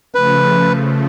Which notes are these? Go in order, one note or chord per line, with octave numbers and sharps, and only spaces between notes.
C#3 F3 A3 B4